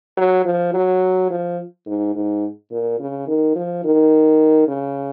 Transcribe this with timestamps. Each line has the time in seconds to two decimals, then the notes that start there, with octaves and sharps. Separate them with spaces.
0.17 F#3
0.45 F3
0.74 F#3
1.31 F3
1.87 G#2
2.15 G#2
2.71 A#2
3.00 C#3
3.27 D#3
3.56 F3
3.84 D#3
4.68 C#3